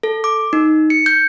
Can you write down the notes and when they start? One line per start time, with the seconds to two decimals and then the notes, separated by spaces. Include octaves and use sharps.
0.03 A4
0.24 D6
0.53 D#4
0.90 C#7
1.06 G6